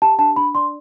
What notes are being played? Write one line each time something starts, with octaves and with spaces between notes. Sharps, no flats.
G4 A5
D4 A5
D4 B5
D5 C6